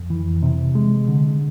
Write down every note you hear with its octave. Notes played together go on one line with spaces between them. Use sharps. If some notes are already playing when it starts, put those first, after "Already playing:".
Already playing: F2
E3
C3
G#3
D3